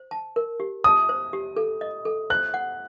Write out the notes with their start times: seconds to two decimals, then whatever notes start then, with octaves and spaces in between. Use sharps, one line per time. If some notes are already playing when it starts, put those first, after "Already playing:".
Already playing: C5
0.11 A5
0.36 A#4
0.60 G4
0.84 A5 D#6
1.09 C5
1.33 G4
1.57 A4
1.81 D#5
2.05 A4
2.30 C5 F#6
2.54 F#5